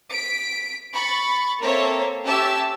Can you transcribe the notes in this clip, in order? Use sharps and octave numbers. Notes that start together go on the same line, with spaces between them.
B6 D7
B5 C#6 A6
A#3 C4 A4 A#4 C#5 E5
C#4 G4 E5 A5 E6